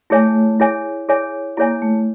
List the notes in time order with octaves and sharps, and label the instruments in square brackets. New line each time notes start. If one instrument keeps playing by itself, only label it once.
[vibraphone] A3 [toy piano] E4 G#4 C#5 E5 G#5
[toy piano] E4 G#4 C#5 E5 G#5
E4 G#4 C#5 E5 G#5
[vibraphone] A#3 [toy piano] E4 G#4 C#5 E5 G#5
[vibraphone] A3